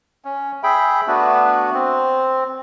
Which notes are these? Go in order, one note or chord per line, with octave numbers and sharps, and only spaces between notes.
C#4
G#4 E5 G5 B5
A3 B3 D4 F#4
C4